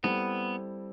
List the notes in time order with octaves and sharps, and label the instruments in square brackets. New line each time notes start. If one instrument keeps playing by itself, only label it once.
[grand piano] G3 C4 E4 A4 [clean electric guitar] B3